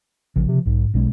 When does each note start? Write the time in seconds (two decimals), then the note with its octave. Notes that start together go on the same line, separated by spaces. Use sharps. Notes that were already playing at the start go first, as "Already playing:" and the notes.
0.36 A1 C#3 F3
0.48 C3
0.66 B1 G#2
0.94 B1 B2 G#3 C#4